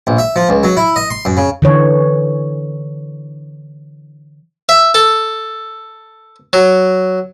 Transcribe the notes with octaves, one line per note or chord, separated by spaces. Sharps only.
A#1
E5
F3
C#2
F#3
E4
D#5
C6
F#2
C#3
D3 E3 C#5
E5
A4
F#3